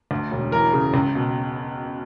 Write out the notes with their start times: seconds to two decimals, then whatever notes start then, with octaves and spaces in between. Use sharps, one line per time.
0.11 D2
0.31 E1
0.52 E3 A#4
0.73 C#3
0.94 C#2
1.15 B2